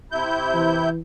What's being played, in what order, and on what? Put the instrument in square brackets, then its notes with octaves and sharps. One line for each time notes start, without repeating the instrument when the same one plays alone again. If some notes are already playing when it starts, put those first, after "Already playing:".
[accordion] C3 E4 G6
[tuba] E3